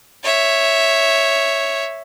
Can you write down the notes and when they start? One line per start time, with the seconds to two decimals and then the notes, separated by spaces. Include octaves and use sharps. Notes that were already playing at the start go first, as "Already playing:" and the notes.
0.24 C#5 E5